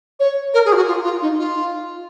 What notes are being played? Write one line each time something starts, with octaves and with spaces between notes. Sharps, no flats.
C#5
A#4
G#4
F4
F#4
F4
F4
D#4
F4